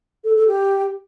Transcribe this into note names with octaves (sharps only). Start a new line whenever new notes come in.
A4
A4
G4